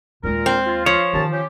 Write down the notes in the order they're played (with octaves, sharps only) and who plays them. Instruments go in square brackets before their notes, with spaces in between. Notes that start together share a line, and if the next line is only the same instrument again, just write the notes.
[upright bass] D#2 G#3 [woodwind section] A#2 A#4
[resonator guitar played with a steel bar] C4
[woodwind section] F4
[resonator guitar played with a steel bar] F3 [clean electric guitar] C#5
[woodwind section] D#2 C#4 A5 [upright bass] D#3 E3
[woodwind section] C#4 F4 G4